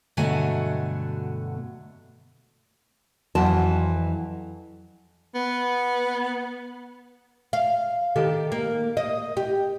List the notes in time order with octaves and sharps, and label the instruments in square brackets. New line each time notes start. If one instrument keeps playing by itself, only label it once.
[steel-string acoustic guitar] G2 B2 D3 F#3 A3 G#5
[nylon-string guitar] F2 E3 F#3 A5
[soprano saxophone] B3
[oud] F5
D#3 G4 A4
A#3
D#5
G4